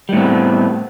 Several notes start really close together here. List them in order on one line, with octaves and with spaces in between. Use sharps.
G3 A2 C4 B3